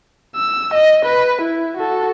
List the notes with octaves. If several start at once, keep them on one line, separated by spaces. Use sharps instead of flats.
E6
D#5
B4
E4
F#4 A4